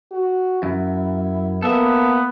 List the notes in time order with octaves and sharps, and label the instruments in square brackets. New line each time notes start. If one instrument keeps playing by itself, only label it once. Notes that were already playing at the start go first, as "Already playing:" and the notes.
[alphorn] F#4
[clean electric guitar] F#2 [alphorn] E4
[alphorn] A#3 [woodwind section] B3 [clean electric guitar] A4 E5